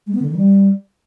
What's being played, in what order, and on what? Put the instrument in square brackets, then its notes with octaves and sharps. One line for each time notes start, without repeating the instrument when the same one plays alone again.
[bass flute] G#3
B3
D3
D#3
G3